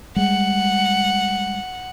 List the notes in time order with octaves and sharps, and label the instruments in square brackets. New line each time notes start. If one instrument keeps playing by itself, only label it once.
[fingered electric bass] G3 G#3 [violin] F#5